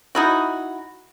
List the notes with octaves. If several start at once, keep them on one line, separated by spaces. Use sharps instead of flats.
D#4 E4 F#4